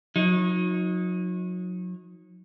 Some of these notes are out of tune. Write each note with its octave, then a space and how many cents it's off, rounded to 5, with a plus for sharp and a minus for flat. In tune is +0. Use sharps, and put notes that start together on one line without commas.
F#3 -35 D#4 +15